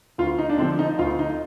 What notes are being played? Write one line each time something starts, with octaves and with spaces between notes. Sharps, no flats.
D2 F4
D#4
D4
D3 F3 C4
D#4
D2 F4
D#4